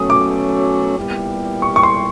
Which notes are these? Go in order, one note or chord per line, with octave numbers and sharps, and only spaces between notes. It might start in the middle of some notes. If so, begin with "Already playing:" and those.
Already playing: B2 F#3 A3 C#4 D#6
D6
A#2 G3 B3 E4 G4
C#6
C#6
C6